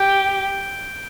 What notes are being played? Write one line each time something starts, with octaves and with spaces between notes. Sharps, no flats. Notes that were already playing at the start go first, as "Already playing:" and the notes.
Already playing: G4 G6 D7 G7